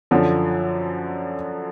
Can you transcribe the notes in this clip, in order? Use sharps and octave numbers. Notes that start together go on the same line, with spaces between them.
F#2 D3 F3